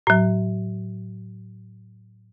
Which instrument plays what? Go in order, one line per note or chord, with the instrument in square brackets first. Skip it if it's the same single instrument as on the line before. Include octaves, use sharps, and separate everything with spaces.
[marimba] A2 F#3